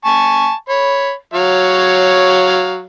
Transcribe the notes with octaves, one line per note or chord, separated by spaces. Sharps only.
G#5 A5 C#6
C#5 B5
F#3 C#5 F5